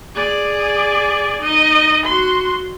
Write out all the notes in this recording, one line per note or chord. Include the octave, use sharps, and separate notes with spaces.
G#4 D5
D#4 D#5
F#4 C6